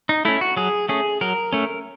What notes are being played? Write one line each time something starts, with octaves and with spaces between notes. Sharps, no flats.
D#4
A3 C#4 E4
F#4
F#3 G#4
A3 C#4 G#4
F#3 A#4
A3 C#4